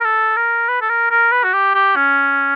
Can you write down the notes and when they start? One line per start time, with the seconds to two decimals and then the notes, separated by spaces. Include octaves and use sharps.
0.01 A#4
0.05 A4
0.37 A#4
0.69 B4
0.82 A4
0.90 A#4
1.11 A#4
1.32 B4
1.44 F#4
1.54 G4
1.75 G4
1.96 C#4